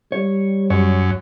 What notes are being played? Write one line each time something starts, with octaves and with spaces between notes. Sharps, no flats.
G3 C#5
F#2 C#5